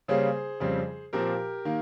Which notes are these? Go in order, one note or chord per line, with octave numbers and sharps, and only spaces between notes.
C#3 G3 A#3 C#4 G#4 C5
F2 C#3 G3 C4
A#2 F3 C4 G4 A#4
D#3 A#3